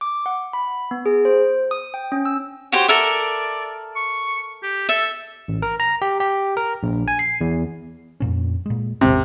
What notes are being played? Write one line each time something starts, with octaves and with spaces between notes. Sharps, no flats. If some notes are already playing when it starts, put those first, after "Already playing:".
D6
F#5
B5
B3
G#4
C5
D#6
G5
C#4
E6
F#4 G4 C5 C#5
A4 A#4 D5 E5
C#6
G4
A4 E5
A1
A#4
A#5
G4
G4
A#4
A#1
G#5
C7
E2
F2 A#2 C#4
A#2 G#3
E1 A1 C3